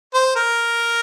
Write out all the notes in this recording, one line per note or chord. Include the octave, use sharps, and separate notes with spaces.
C5
A#4